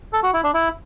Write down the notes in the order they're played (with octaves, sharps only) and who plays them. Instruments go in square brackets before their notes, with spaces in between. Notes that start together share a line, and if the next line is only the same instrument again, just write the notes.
[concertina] A4
F#4
E4
D4
E4